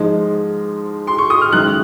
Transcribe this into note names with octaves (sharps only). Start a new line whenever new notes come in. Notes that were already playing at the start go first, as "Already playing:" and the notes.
Already playing: G#2 F3 G#3 D#4
C6
C#6
D#6
F6
F#1 F#2 D#3 G#3 F#6